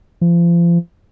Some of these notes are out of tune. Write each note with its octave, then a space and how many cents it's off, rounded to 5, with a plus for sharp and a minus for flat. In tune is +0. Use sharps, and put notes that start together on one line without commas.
F3 -35